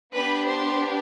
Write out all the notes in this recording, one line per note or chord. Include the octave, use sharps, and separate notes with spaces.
B3 D4 G4 B4 B5
C5 C6